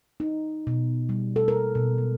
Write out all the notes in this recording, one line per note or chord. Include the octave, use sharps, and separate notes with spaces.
D#4
B2
G3
A4
A#4
B2
G#3